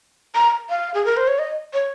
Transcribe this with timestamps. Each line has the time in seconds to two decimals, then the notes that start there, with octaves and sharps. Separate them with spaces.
0.35 A#5
0.70 F5
0.94 G#4
1.05 A#4
1.17 C5
1.28 C#5
1.39 D#5
1.74 C#5